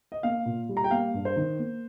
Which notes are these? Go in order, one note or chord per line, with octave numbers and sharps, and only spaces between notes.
D#5
A#3 F5
A#2
G3
A#5
G5
A#3 F5
G2
C5
D#3
A#3